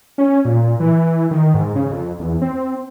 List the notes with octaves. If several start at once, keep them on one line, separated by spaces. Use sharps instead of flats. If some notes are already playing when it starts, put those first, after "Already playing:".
C#4
A#2
E3
D#3
G#2
C#3
F2
E2
C4